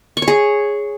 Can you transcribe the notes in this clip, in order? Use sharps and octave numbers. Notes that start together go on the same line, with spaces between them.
C#6
C#5
G#4